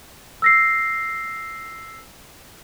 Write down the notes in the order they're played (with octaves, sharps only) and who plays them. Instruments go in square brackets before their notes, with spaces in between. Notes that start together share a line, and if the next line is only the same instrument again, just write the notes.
[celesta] E6 A#6 C7